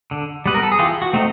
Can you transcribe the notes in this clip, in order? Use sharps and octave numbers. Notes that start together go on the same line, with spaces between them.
D3
G3 B3 B4
A#4
A4
G#4
E3 F4 G4
F#4
A3 C4 D#4